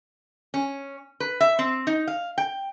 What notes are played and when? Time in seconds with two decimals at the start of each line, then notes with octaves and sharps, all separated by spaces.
0.54 C#4
1.20 B4
1.40 E5
1.59 C4
1.87 D#4
2.07 F5
2.38 G5